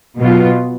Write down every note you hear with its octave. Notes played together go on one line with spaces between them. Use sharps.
B2 F#3 B3 F4